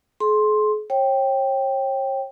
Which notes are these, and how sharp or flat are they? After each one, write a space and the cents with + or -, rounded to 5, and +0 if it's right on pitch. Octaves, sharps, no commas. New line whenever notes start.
G#4 +45 C6 +10
C#5 -40 G5 +0